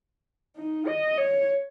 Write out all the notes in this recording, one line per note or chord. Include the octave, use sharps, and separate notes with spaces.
D#4
D#5
C#5